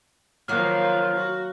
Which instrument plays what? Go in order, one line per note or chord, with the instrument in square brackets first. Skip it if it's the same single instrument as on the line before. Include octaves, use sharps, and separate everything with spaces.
[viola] D#3 F3 [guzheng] F#3 A#3 [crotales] F6 F#6
[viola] F#4